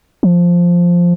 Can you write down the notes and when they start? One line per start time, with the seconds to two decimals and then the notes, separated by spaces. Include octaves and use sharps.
0.23 F3